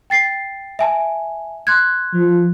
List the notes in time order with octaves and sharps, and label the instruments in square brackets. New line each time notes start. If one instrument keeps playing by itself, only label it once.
[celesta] G5 A6 C7
E5 G#5 A5
C6 F#6 G#6
[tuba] F3